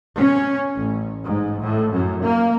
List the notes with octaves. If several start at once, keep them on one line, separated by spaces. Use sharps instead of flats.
C#4
A1
G#2
A2
F#2
A#3